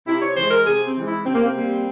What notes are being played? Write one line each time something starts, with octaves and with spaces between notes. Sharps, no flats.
C3 E4
C#5
E3 G#3 C5
A#4
C3 G#4
C4
E3 G#3
E4
C3 C4
A#3
C4
G3 A#3